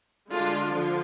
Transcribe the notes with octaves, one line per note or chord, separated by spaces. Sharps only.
D3 G#3 D4 F4
D3 F3 F4